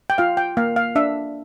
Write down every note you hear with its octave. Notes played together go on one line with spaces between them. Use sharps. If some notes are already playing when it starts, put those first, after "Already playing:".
G5
F4 F5
G5
A#3 F5
F5
D4 E5